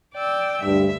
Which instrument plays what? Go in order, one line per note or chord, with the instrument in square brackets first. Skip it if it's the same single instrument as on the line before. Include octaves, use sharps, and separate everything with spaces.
[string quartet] D5 G5 E6
[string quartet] D2 E5 [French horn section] G2